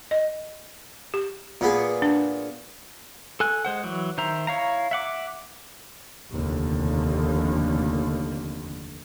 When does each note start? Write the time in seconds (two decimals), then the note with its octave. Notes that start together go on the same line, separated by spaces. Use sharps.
0.11 D#5
1.14 G4
1.61 A#2 B3 G#4
2.02 D4
3.40 A4 G#5 F#6
3.65 G#3 C5 F#5
3.84 E3 F#3
4.18 D#3 C5 E5 A#5
4.47 E4 C#5 F5 A#5
4.91 E5 F#5 D6
6.31 F1 D#2 D3